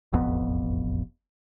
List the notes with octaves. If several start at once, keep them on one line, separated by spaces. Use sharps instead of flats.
E1 A1 F2 B3